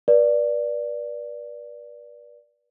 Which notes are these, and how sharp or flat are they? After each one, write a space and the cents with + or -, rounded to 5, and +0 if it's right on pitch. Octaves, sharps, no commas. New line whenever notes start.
B4 -40 D5 +0